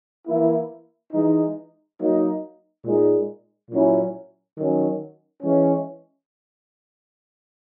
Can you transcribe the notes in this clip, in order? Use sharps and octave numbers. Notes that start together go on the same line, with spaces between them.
E3 A#3 E4
E3 G#3 D#4
F#3 A#3 D#4
A#2 G#3 D#4
A#2 F#3 C#4 E4
D#3 F#3 C#4
E3 G#3 C#4